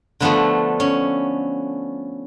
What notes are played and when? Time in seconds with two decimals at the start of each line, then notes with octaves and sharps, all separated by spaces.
0.20 D3 F3 A3 B3
0.80 C#4